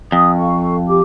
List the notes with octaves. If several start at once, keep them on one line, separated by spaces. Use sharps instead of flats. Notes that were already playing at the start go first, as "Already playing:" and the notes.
F2 D#6
A4 F5 C#6
G4 D6